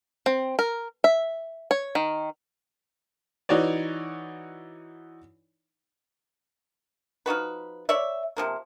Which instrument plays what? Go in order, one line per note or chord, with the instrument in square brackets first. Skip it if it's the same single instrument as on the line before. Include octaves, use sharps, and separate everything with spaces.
[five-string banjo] C4
A#4
E5
C#5
D#3
[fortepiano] E3 D#4 F#4 C#5 D5
[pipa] F3 D#4 F#4 B4
C#5 D5 E5
C3 F3 A#3